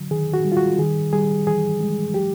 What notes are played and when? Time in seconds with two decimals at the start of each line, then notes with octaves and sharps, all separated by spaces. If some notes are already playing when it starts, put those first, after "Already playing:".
Already playing: D3 F#3
0.11 D#3 G#4
0.34 F#4
0.44 G3
0.52 F4
0.57 F#4
0.78 D#3 G#4
1.13 G3 G#4
1.47 E3 G#4
1.81 G#3
2.14 F#3 G4